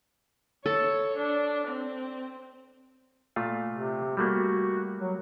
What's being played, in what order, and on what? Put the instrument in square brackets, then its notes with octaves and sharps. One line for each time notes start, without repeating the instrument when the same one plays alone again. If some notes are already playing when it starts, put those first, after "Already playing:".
[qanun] A4 [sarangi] C#5
[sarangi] D4
C4
[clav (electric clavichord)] A#2 A3 F4
[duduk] C3
[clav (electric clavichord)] G3 A3 A#3 [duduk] F#4
[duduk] F#3